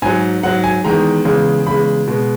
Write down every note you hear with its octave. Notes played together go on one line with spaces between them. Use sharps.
G#2 F#3 G#5
G#2 F#3 F#5
G#5
E2 D#3 G#3 A#5
E2 C#3 G#3
E2 C#3 G#3 B5
B2 G#3